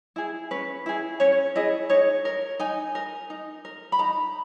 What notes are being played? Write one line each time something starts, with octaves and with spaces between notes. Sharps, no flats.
E4 G#4
C#4 B4
E4 G#4
C#4 C#5
E4 G#4 D#5
D#4 C#5
A#4
D#4 G#5
A#4
D#4
A#4
B5
D#4 A#5